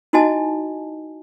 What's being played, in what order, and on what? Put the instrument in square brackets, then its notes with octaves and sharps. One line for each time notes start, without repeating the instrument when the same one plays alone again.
[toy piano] D#4 E4 F#4 D#5 G#5 A5